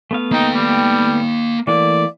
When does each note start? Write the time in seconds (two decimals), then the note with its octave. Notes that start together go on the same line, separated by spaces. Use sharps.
0.11 A3 B3 F5
0.32 A#3 D#4 G5
0.55 G3
1.67 E3 A3 A#3 D5